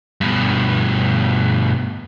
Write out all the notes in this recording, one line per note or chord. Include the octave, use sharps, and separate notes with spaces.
G2 B2